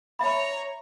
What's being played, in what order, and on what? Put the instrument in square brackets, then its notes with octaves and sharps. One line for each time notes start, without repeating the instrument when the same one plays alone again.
[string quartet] C#5 A#5 [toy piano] E5 B5